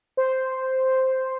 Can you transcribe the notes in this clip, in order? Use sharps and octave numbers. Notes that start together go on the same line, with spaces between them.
C5